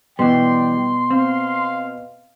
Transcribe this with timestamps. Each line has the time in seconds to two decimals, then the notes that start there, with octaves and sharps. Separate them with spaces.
0.19 B2 E3 G3 D5 G5 C6
1.11 C4 F5